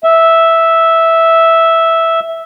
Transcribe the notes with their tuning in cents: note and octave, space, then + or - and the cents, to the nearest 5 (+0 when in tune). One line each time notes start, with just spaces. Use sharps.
E5 -5